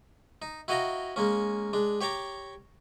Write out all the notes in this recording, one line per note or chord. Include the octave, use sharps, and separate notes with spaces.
D#4
E4 F#4 D#5 F5 G5 A#5
G#3 A#3 C#4
G#3 D4
G4 C#5 G5 A#5 D6